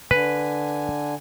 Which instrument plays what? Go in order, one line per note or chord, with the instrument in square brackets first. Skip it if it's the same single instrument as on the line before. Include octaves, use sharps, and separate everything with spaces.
[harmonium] D3 G#5 [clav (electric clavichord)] B4